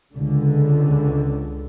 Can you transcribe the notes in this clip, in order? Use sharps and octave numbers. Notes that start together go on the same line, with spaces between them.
C#2 D3